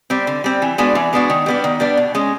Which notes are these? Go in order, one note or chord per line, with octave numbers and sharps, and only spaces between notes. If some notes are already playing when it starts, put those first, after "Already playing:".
G3 C4
D3
G3 C4
E3
G#3 B3 D4 F#4
E3
G#3 B3 D4 F#4
D#3
G3 B3 D4
D#3
G3 B3 D4
B2
G#3 C#4